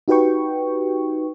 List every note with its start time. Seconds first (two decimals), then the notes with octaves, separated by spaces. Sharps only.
0.08 D#4 F#4 G4 B4 G5 C#6